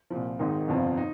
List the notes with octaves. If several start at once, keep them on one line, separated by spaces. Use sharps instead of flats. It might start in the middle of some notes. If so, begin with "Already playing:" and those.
C2 A#2 F3
G#1 G#2 D#3 D#4
G1 F2 C3 F3
D#4